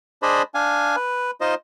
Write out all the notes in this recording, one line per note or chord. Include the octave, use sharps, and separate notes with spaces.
D4 G#4 C5 D5 D#5 B5
D4 F5 G#5
B4
D#4 F4 C5 D#5